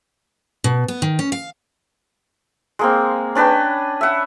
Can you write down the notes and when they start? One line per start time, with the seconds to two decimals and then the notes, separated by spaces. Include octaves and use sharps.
0.64 B2
0.88 B3
1.02 D#3
1.19 C#4
1.32 F5
2.79 G#3 A#3 C4
3.35 C#4 D4 B4 G5
4.01 E5 F#5